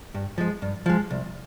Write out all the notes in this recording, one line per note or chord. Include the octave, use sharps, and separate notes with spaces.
G2
F3 G#3
G2
F3 G#3
C2